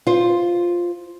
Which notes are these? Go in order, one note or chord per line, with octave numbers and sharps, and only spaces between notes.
F4 C5